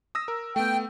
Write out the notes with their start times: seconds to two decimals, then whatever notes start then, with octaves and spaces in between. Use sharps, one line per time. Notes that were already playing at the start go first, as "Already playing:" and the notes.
0.15 D#6 E6 A#6
0.28 A#4
0.56 A3 B3 G5